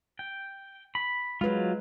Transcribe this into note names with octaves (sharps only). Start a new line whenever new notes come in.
G5
B5
F#3 G#3 F4 B4